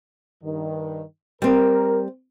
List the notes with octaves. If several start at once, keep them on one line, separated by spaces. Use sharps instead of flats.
G2 D#3
G3 C4 A#4